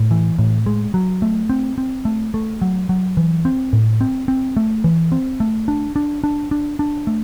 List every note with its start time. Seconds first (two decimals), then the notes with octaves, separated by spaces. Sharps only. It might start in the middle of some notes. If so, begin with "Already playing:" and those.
Already playing: A2
0.11 E3
0.39 A2
0.66 G#3
0.94 F#3
1.22 A3
1.49 C4
1.78 C4
2.05 A3
2.34 A3
2.62 F#3
2.89 F#3
3.17 E3
3.45 C4
3.73 A2
4.01 C4
4.28 C4
4.57 A3
4.84 E3
5.12 C4
5.40 A3
5.68 D4
5.96 D4
6.24 D4
6.51 D4
6.79 D4
7.07 A3